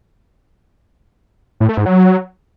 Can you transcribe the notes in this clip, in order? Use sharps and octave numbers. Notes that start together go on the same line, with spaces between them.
A2
A3
G#2
F#3